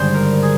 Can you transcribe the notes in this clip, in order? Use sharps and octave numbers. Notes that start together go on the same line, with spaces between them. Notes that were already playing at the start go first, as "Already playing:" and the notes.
Already playing: G#1 G2 D3 G#3 C5
A#4
G#4